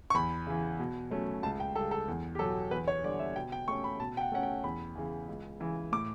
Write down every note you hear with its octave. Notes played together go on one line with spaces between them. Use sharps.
C#6
E2 B5
C#3 E3
B2
F#3 A3 C#4
C#2 A5
G5
C#3 G3 A4
A4
E2
G4
B2 F#3 A4
E2 B4
C#5
D3 G3 D5
E5
B2 G5
G5
A3 C#4 C#6
B5
B2 A5
G5
F#5
A3 C#4 F#5
G5
E2 B5
C#3 E3
C#2
C#3 E3
A2 D6